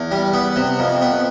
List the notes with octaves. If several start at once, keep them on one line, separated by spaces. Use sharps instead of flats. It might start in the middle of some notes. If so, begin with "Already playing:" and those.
Already playing: E2
G3
B3
C3
F2
B3